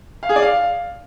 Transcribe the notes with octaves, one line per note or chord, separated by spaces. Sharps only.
F5
G#4
D5
F5